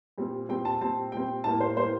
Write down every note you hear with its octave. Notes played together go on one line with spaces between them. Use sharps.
A#2 G3 C4
A#2 G3 C4 G5
A5
A#2 G3 C4 A5
A#2 G3 C4 G5
A2 G3 A#3 A5
C5
A2 G3 A#3 C5